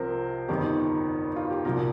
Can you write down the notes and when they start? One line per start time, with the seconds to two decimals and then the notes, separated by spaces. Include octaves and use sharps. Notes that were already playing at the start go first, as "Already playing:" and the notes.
Already playing: C2 C3 F3 A#4 C5
0.48 G1 F2 D#3 G4
0.63 D#4
1.36 F4
1.50 G4
1.65 C2 A#2 F3 A#4